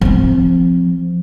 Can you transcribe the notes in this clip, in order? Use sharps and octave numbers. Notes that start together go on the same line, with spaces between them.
F3 C4